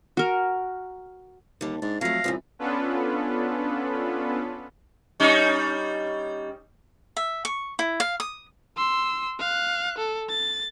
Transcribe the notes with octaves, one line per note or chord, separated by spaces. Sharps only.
F#4 A#4
D#2 D3 G3
G#2 D4 A6
F2 F#3 A3 F5 A#6
C2 F#2 E3 F3
B3 C#4 D4 F4 A4 B4
G3 C#4 D#4
E5
C#6
E4
F5
D#6
C6 E6
F5 F#6
A4
A6